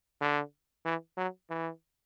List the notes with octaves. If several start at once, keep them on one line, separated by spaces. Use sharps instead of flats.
D3
E3
F#3
E3